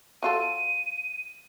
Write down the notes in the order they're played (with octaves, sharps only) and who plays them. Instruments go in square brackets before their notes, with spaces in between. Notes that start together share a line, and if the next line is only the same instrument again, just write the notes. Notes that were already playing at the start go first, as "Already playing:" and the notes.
[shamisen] F#3 F4 A4 [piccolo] D#7